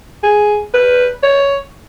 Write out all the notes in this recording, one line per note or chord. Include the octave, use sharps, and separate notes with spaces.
G#4
B4
C#5